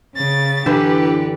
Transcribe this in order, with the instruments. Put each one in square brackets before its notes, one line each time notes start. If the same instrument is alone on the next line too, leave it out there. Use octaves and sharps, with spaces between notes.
[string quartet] C#3 A6
[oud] F#2 D3 E3 [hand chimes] D4 [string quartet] G4 B4